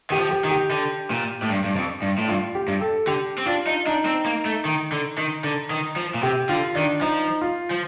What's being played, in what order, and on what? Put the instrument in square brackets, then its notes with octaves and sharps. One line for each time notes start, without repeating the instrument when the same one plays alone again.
[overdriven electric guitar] D#3 [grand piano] G4
[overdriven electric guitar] F3
[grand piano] G4
[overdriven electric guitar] D#3
[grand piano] G4
[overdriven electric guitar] D3
A#2
A2
G2
G2
F2
G2
A2
[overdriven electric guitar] G2 [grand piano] F4
[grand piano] G4
[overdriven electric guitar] G2
[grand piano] A4
[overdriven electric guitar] D3 [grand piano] G4
[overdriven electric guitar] C4
[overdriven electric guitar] D4 [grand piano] F4
[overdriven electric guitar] D#4
[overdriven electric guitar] D4 [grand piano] D#4
[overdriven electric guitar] C4
A#3
A3
D#3
D3
D#3
D3
D#3
F3
A#2
[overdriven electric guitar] C3 [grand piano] G4
[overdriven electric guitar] D3 [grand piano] F4
[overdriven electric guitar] D#3 [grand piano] D4
[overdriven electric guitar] F3 [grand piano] D#4
[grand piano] F4
[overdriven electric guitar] F3